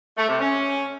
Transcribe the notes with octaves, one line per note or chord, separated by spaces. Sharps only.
A3
C3
C#4